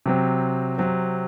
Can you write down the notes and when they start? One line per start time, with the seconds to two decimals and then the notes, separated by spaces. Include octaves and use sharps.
0.06 C3 F#3 C4
0.78 C3 F#3 C4